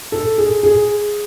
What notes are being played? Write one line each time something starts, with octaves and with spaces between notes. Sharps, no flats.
A4
G#4
G#4